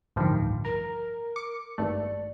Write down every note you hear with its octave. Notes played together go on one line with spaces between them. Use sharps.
A1 D2 G2 D#3 F3 G3
A#4 A#5
D6 C#7
G#1 G2 A3 D5